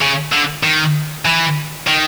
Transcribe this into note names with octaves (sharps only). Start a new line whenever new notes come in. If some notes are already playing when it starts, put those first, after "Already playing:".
C#3
D3
D#3
E3
D#3